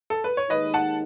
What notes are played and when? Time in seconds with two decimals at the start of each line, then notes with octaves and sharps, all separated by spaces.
0.10 A4
0.24 B4
0.37 C#5
0.50 D#2 D#3 G#3 D#4 B4 D#5
0.74 F#5 A5